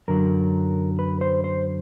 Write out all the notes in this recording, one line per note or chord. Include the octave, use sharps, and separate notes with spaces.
F#2 D3 F#3 A#4
B4
C5
C5